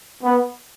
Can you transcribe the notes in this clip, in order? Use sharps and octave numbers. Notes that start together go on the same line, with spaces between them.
B3